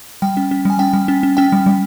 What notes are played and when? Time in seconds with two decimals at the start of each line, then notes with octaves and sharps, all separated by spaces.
0.22 G3 G5
0.37 C#4
0.51 C#4
0.65 G3 G#5
0.79 C#4 G5
0.93 G3
1.08 C#4
1.23 C#4
1.37 C#4 G5
1.52 G3
1.66 G3